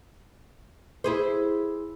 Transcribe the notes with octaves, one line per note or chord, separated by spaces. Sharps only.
E4 G#4 C5